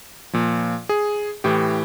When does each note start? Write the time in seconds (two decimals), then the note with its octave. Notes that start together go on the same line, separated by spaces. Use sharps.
0.33 A#2 F3
0.89 G#4
1.44 A2 E3 G4